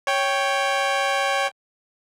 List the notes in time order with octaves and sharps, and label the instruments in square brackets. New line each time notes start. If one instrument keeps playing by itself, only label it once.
[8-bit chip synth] C#5 G5